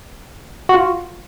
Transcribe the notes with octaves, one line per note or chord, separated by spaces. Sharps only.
F#4
F4